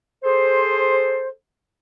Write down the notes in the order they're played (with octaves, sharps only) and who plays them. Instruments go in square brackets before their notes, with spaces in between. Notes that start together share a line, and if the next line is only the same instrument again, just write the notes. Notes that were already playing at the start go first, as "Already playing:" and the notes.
[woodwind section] G#4 A4 C5